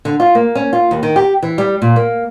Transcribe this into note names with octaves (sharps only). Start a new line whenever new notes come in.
D3
F4
A#3
C#4
F4
D#2
D#3
G4
E3
G3
A#2
A#3